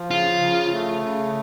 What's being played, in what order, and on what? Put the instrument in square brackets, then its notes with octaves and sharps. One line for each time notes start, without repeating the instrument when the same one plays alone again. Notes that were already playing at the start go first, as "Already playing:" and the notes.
Already playing: [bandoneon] F3
[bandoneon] C#3 [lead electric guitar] F4
[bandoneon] C#3
A3
C#3